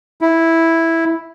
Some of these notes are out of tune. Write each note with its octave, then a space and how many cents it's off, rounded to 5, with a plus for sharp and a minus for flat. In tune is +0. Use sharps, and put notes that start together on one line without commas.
E4 -5